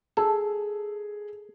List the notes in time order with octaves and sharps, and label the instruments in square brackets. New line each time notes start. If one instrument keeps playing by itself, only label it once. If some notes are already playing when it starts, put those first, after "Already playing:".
[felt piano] G#4 [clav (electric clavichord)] A4